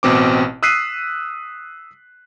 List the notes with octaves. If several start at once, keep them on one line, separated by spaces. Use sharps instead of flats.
A1 B2 C4 D6
D#6 E6 F#6 B6 C7 D#7